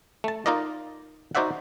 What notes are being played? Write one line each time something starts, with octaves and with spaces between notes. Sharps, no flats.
A3 A5
D#4 F4 A#4 D5 D#5
D#4 F#4 C5 D5 E5 F#5